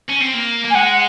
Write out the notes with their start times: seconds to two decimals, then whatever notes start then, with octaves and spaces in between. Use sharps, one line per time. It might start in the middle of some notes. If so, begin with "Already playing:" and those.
0.09 C#4
0.22 C4
0.34 A#3
0.65 A#3
0.70 G#5
0.75 G#3 F#5
0.88 F#5